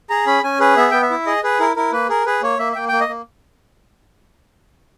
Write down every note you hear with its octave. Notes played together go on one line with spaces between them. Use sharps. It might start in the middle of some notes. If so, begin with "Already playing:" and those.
G#4 A#5
C#4 B5
C#4 G#5
G#4 B4
B3 E5
B3 G5
E5
E4
G#4 D#5
G#4 B4
E4 A#4
E4 A#4
A#3 B4
G#4 A#4
G#4 B4
A#3 C#5
A#3 E5
E5
A#3 G5
A#3 G5
D#5
A#3